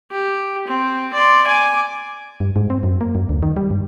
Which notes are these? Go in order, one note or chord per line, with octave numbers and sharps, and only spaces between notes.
G4
C4
D5 C6
G#5 D6
G2
G#2
C4
F#2
A#3
F#2
D2
D#3
G3
G2